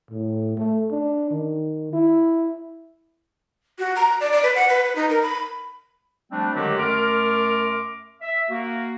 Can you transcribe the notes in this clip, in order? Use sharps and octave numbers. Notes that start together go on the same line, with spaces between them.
A2
A3
D4
D#3
E4
F#4
A#5
D5
D5
B4
F#5
B4
B4
D#4
A#4
B5
F3 G3 A3 C4 D4
D3 D#3 F#3 G#3 F#4 G4
F#2 A3 A#4 C6 D6 F6
E5
A#3 F#4